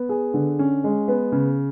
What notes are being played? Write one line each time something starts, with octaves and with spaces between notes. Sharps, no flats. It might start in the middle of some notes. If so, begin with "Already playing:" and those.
Already playing: B3
G#4
D3
C#4
G#3
B3
C#3